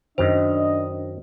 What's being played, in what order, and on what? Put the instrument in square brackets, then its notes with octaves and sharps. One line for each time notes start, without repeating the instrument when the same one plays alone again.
[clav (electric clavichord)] F#2 D#3 [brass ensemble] D4 D#5 [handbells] C5